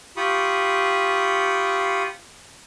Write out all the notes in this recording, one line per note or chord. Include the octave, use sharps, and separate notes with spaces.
F4 G4 B5 C#6 D#6